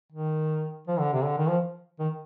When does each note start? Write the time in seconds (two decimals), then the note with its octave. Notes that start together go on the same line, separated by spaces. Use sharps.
0.12 D#3
0.87 F3
0.99 D3
1.13 C3
1.24 D3
1.38 D#3
1.49 F3
1.99 D#3